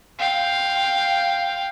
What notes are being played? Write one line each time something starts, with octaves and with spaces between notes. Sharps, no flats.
F5 G5